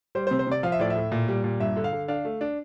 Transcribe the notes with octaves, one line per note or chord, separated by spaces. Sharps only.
G3 C5
C5
C3
C5
C3 D5
F3 F5
E5
A2 D5
E5
A2
A#2
G3
A#2
G2 E5
D3
F5
D3
D4 F5
A3
D4